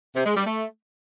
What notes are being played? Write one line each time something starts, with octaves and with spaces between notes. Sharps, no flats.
C3
G#3
G3
A3